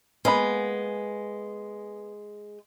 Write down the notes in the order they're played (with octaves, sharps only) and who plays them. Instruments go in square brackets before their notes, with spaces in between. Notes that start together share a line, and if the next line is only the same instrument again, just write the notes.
[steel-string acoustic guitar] G#3 [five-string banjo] A#3 B3 B5